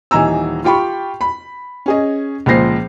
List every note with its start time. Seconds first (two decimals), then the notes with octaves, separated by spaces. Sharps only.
0.11 D#1 E3 D#4 G#5 A#5 E6
0.64 F4 G4 G5 B5 C#6
1.21 B5
1.86 C#4 G#4 D#5
2.46 C#2 A#2 F3 C5 A#6 C7